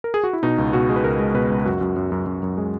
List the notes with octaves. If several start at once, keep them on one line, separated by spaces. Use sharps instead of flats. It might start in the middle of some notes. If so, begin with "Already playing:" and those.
A#4
G#4
F#4
E4
B2 D#4
C#2
B2 F#4
G#3
B4
C#2 A#4
G#3
B2 B4
C#2
F#2 F#4
F#2
F#2
F#2
F#2
F#2
G#3